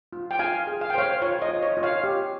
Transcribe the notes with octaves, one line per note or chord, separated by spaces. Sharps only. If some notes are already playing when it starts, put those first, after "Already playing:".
F4
G5
F4 F5 G#5
G#4
F5
G5
C5 C#5 F5
F4 C#5
D#5
F4
C#5
F4
C#5 F5
G4